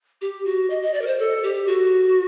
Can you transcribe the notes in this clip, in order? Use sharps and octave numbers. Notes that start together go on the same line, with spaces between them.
G4
F#4
D#5
D#5
D5
A#4
C5
A4
G4
F#4